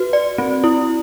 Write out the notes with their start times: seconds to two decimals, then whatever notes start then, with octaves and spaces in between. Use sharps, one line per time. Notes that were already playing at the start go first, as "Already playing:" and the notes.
Already playing: F#4 B4
0.13 D5
0.38 C4
0.64 E4